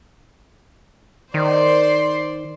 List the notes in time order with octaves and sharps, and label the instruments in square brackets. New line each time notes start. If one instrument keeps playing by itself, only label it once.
[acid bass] D#3 [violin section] C5 D5 C6